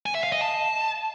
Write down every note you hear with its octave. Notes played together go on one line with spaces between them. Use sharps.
G#5
E5
F5
D#5
A5